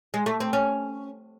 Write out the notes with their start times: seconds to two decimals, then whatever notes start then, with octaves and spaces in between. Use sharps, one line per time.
0.14 G#3
0.26 A3
0.40 C4
0.53 C#4